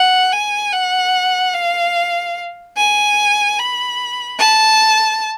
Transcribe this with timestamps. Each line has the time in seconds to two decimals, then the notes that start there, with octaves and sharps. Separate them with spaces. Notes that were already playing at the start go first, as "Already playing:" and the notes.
Already playing: F#5
0.33 G#5
0.73 F#5
1.55 F5
2.77 G#5
3.59 B5
4.39 A5